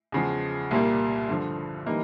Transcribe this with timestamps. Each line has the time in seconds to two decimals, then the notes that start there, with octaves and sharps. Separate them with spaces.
0.12 E2 C#3 F3 G#3
0.71 C2 A#2 G3 A#3
1.29 G2 D3 F3
1.86 E3 G3 A#3 D#4